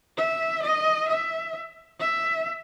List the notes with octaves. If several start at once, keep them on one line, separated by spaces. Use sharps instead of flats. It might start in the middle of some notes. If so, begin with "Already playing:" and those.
E5
D#5
E5
E5